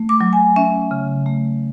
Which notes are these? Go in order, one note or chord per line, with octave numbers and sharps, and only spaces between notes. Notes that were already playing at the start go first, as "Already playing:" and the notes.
Already playing: A3
D6
F#3
G#5
C#4 E5
C#3
A3